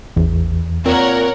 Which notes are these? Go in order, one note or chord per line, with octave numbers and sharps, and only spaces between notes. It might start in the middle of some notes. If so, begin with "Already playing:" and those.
A1 E2
A#2 C4 A#4 C#5 F#5